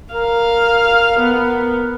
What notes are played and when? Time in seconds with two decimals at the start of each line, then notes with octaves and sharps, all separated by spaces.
0.14 A#4 F5
1.20 B3